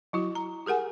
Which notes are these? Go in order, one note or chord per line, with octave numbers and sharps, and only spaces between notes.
F#3 E4 F#4
A#5
G4 G#4 A#4 F#5 G#5